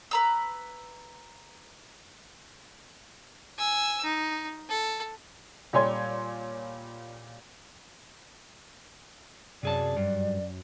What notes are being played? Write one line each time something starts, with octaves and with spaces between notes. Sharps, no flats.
B4 A#5 E6
G#5 E6
D#4
A4
A#2 G3 C#5 G#5 C6 G#6
F#2 C3 G#4 D5 A5
G2